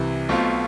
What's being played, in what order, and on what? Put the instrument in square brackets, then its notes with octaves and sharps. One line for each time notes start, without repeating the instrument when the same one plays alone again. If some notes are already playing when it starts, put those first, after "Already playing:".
Already playing: [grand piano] C2 C3 E3
B1 B2 A3 C4 F4